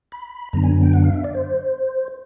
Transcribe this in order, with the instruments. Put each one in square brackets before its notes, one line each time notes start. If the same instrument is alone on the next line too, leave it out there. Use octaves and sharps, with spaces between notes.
[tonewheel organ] B5
F#2 D3 F#3 B3 D4 A#5
G#5
G5
F#5
F5
E5
D5
C5